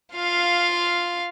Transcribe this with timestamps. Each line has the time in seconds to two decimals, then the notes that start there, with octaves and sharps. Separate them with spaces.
0.13 F4 F5